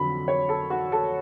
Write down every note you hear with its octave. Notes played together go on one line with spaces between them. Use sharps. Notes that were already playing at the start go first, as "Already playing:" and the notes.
Already playing: F2 D3 F#3 B5
C#5
A4
F#4
A4